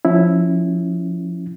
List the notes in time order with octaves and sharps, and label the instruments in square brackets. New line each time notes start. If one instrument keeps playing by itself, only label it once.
[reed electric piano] F3 C#4 E4